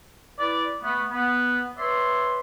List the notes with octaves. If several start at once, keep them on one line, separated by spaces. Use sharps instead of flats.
E4 B4 D5
A3 B3
B3
B4 C#5 D5 E5 C6